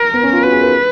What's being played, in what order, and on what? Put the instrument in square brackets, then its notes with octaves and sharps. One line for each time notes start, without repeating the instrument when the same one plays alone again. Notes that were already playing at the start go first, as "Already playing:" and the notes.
Already playing: [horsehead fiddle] A#4
[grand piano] B3
C#4
F4
[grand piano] F#4 [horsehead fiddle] B4
[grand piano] G#4
A#4